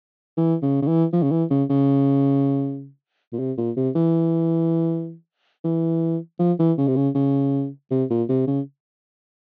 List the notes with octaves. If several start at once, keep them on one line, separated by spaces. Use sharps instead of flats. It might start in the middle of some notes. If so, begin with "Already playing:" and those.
E3
C#3
C#3
E3
F3
C#3
E3
C#3
C#3
A#2
C3
A#2
C3
E3
E3
F3
E3
C#3
C3
C#3
C#3
C3
A#2
C3
C#3